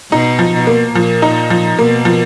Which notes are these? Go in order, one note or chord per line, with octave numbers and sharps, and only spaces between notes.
B2 D#4
F3
B2
A#3
A#2 F3
D#4
F3
B2 A#3
F3